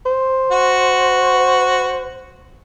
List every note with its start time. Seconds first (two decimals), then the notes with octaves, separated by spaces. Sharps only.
0.06 C5
0.52 F#4